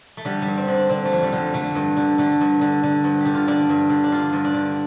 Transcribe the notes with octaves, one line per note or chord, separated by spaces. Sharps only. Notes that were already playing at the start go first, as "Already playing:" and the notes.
A3
D3 G3
G3
G2
C4
D3
D4
D3 C4
A3
F2
G3
D3
G3
D3 A3
G2
D3
D3 A3
G2
D3
D3
G2
G4
D3
F4
D3 D4
G2
D3
D4
D3 F4
G2
D4
D3